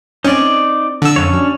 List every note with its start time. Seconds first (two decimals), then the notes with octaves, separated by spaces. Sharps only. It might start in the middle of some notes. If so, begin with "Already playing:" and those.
0.24 C4 C#4 D#4 D5
1.02 D3 E6
1.16 F2 C#4 D4 C#5
1.33 F#4